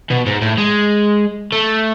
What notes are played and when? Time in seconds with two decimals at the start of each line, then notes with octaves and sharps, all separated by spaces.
0.10 B2
0.26 G#2
0.42 A2
0.58 G#3
1.52 A3